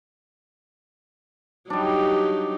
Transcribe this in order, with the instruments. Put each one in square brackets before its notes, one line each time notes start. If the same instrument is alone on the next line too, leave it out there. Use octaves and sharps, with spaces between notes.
[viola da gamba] F#3 D#4 G4 [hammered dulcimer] G3 D4